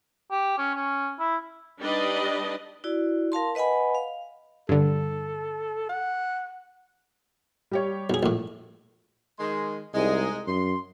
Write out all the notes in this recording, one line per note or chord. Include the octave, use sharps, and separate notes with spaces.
G4
C#4
C#4
E4
G3 D4 D#4 B4 D5 D#5
E4 F#4 D5
A#4 F5 A5 C6
B4 D#5 F#5 G#5 B5
F5
G2 D3 A4
F#5
G3 G4 C#5
B1 G#4
A#1 A2
D#3 G#3 C6
C2 G#3 D#4
F#2 C6